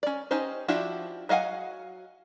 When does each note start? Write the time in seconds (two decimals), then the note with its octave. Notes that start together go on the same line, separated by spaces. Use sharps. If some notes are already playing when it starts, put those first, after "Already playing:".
0.03 C#4 D5
0.31 C#4 D#4 G4 C5
0.68 F3 D4 E4 F#4 G4
1.29 F#3 D#5 F5 F#5 G#5